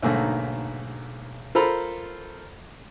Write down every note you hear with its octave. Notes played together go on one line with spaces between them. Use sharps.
B1 G#2 D3 A3 A#3
F4 A4 A#4 C5 A#5 B5